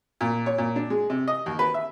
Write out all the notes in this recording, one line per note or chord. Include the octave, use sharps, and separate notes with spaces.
A#2
C#5
A#2
D4
G#3
C3
D#5
D#2
B4
E5